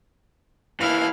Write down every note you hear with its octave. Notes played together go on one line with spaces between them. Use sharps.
D#2 E3 E4 F5